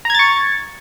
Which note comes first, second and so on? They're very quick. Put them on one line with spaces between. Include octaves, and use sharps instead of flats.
A#5 G#6 A6 C#6